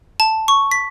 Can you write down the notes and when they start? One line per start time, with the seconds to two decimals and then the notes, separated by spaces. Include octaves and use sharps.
0.20 A5
0.48 C#6
0.71 B6